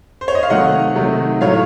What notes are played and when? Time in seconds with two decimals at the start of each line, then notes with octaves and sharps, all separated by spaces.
0.21 C5
0.28 C#5
0.35 D#5
0.43 F5
0.50 C3 D#3 F#3 A3 D#5 F#5
0.95 C3 D#3 F#3 A3
1.41 A2 F#3 A3 C#5 F5